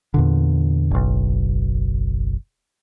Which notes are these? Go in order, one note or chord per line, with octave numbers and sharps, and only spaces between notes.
E2 A#2 D3
F#1 B1